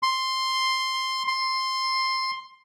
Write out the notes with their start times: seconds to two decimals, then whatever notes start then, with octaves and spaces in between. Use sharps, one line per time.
0.03 C6
1.27 C6